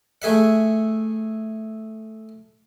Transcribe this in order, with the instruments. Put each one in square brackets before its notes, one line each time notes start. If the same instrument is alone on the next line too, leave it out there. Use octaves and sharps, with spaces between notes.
[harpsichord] A3 G#4 E5 F#5